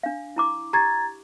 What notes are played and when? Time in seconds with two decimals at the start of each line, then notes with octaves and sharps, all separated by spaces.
0.03 D4 F5
0.36 E4 A#5 D6
0.73 G4 A#5 G#6 A6